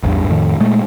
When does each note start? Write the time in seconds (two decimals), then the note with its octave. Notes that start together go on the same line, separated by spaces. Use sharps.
0.03 A1 E2 G2
0.28 F2 A2 D#3
0.60 A#2 G#3 A3